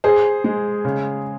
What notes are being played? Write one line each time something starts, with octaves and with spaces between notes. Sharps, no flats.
G#4 C5
G#3
C#3